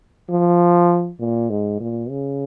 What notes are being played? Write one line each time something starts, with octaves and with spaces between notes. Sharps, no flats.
F3
A#2
G#2
A#2
C#3